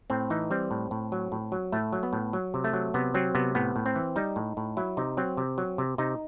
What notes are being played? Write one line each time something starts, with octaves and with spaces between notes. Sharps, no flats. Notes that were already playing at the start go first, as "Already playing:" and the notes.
A2 C4
E3 D#4
G3 C4
A2
A2
F#3
A2
F#3
A2 A3
F#3
B3
A2
F#3
C3
A3
F#3
C3 B3
F#3 C4
C3 B3
A2 B3
A2
C4
E3
G3 D#4
A2
A2
F#3 E4
C3 D#4
F#3 C4
C3
F#3
C3
C3 D#4